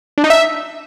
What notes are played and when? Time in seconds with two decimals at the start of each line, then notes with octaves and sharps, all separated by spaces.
0.18 D4
0.24 D#4
0.30 E5